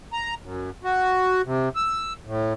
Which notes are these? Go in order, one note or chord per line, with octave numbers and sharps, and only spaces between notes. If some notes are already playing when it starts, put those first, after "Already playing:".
A#5
F#2
F#4
C3
E6
A2